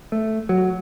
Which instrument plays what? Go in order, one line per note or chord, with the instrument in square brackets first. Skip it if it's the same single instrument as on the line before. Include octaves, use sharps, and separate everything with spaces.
[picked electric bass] A3
F#3